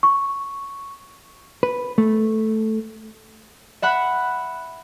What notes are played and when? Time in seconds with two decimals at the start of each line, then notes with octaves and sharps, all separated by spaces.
0.03 C#6
1.63 B4
1.98 A3
3.82 E5 F#5 B5 F#6